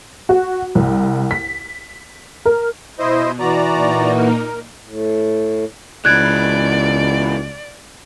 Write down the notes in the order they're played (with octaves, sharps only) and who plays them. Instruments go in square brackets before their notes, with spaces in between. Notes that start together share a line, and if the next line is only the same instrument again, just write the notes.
[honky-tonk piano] F#4
C2
B6
A#4
[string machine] B2 [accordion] E4 C5 D#5
[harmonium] E3 F#4 [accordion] D5 A#5
[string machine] A#2 A#3 D#4
[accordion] A#4
[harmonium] A2
[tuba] C#2 [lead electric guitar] E3 G#3 [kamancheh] D5 [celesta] F#6 G#6